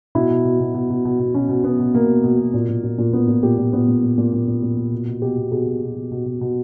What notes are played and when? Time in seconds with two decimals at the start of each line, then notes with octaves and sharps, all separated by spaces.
0.15 B2 E4
0.30 B2
0.45 B2
0.60 B2
0.74 B2
0.90 B2
1.05 B2
1.19 B2
1.34 B2 C#4
1.49 B2
1.64 B2 B3
1.79 B2
1.94 B2 A#3
2.08 B2
2.24 B2
2.38 B2
2.54 A#2
2.69 A#2
2.84 A#2
2.98 A#2
3.13 A#2 B3
3.28 A#2
3.43 A#2 G4
3.58 A#2
3.73 A#2 B3
3.88 A#2
4.03 A#2
4.18 A#2
4.33 A#2
4.48 A#2
4.62 A#2
4.77 A#2
4.92 B2
5.07 B2
5.22 B2 G4
5.37 B2
5.52 B2 G#4
5.67 B2
5.81 B2
5.96 B2
6.11 B2
6.26 B2
6.41 B2